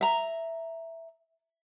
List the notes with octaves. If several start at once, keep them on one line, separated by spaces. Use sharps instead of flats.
E5 A#5